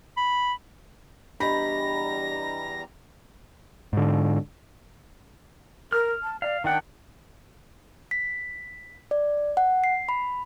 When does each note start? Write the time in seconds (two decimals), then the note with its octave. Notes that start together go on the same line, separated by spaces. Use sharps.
0.17 B5
1.40 E2 G3 D4 G4 D#5 A#5 B5 A#6
3.93 G#2 D3
5.92 A#4 F6
6.23 A5
6.42 D5 F5
6.64 D#3 D4 F#5 G5
8.11 B6
9.11 D5
9.57 F#5
9.84 C7
10.09 B5